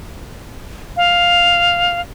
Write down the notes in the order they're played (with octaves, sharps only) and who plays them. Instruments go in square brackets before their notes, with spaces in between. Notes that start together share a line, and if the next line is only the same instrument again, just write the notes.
[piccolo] F5